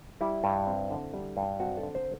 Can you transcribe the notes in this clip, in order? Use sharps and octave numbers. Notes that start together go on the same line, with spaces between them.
G3 E4
G2
C4
D3
G3
G2
C4 F#4
A4
D3
C5